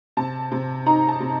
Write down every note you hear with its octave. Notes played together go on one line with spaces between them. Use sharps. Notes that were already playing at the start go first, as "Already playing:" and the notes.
C3 A5
C3
D#4 A#5
A5
C3